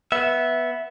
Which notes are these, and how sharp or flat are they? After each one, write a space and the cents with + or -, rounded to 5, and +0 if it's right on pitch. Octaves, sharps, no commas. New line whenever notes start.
B3 -5 E5 +0